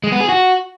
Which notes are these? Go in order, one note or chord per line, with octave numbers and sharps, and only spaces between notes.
G#3
B3
G#4
F#4